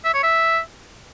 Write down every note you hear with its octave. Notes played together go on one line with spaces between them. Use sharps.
E5
C#5
E5